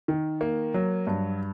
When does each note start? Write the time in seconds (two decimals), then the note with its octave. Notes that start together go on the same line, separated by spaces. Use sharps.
0.08 D#3
0.41 A#3
0.74 F#3
1.07 G2